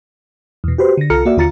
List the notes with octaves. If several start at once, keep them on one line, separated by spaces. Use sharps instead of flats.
E2 B2
F#4 G4 B4 C5
D3 A#6
C2 F4 A4 A#5 F6 C#7
A#3 F#4 D5 E5
D#2 D3 F4 A#5 A6 C#7